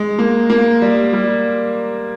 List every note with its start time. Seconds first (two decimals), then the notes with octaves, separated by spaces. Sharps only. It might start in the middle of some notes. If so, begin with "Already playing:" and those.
Already playing: G#3
0.19 A#3
0.50 A#3
0.82 G3
1.13 G3